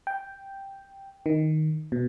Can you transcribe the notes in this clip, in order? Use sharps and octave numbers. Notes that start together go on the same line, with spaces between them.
G5
D#3
B2